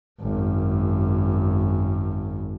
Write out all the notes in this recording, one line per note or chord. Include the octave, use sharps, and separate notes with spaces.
G#1 F#2